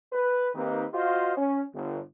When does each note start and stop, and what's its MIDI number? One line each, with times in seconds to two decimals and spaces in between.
0.13 0.49 71
0.55 0.85 51
0.55 0.85 58
0.55 0.85 60
0.55 0.85 63
0.55 0.85 67
0.55 0.85 71
0.93 1.34 65
0.93 1.34 66
0.93 1.34 72
0.93 1.34 75
0.93 1.34 77
1.37 1.62 61
1.74 2.00 31